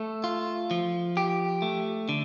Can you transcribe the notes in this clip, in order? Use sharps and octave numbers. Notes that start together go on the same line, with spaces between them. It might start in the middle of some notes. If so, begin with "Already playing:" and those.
Already playing: A3 A4
F4
F3
G4
A3
D3